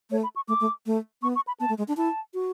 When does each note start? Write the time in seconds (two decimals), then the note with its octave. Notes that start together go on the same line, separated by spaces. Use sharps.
0.10 A3 C#5
0.23 B5
0.36 C#6
0.48 A3 D6
0.61 A3
0.86 A3
1.22 B3 C#6
1.36 C#6
1.47 B5
1.60 B3 A5
1.69 A3
1.78 G#3
1.88 D4
1.97 E4 A5
2.34 F#4